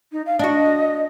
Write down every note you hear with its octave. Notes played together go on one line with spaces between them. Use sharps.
D#4
F5
D4 F#4 D#5